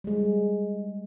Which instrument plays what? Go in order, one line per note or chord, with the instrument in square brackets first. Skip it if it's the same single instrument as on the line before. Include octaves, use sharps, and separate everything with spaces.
[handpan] G3 G#3